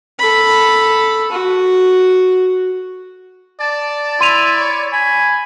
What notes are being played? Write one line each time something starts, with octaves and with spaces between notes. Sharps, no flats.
A4 B5
F#4
D5 A5
E4 C6 D#7 F7
C#5
G#5 B5